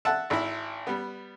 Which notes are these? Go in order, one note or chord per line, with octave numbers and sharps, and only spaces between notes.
E5 F#5 A5
G#1 E4
G3 B3